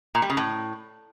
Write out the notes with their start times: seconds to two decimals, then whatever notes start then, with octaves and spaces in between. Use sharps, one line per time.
0.15 A#2
0.22 G3
0.30 C#3
0.37 A2